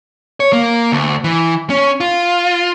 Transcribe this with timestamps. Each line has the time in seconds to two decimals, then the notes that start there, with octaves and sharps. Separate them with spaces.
0.40 C#5
0.53 A#3
0.92 D2
1.24 E3
1.70 C#4
2.00 F4